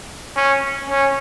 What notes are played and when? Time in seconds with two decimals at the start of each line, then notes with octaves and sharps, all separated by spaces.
0.36 C#4
0.90 C#4